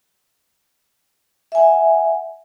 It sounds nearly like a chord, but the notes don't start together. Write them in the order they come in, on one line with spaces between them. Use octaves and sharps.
E5 G#5 F#5